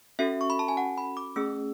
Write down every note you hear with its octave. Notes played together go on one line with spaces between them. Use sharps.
C#4 F#4 A4 E5
C#6
B5
A5
G#5
F#5
B5
D6
A3 C#4 G#4 E6